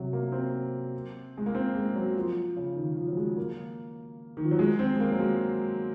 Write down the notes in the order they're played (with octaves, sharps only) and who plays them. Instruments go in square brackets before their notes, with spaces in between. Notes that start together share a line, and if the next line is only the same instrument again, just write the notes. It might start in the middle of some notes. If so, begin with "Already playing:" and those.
Already playing: [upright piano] C3 F#3
A#3
C4
G#3
A#3
C4
G#3
F#3
F3
C#3
D#3
F3
F#3
G#3
A#3
D#3
F3
F#3
G#3
C4
G#3
A#3
F#3
G#3